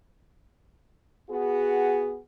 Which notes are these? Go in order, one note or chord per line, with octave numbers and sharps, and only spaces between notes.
B3 F#4 G#4